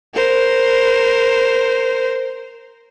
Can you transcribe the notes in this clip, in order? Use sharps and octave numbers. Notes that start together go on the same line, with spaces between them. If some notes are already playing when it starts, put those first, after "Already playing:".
A#4 C5